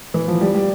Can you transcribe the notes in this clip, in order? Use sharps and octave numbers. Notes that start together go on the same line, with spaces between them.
E3
F3
G3
G3